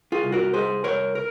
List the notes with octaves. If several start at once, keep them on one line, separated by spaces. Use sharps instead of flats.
F4 G#4
C2
F#4 A#4
C2 G#4 C5
C2 A#4 C#5
A#4